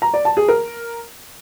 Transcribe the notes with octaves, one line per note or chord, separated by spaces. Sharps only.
A#5
D5
A5
G#4
A#4